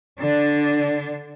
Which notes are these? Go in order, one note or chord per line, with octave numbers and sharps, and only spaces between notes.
D3 D4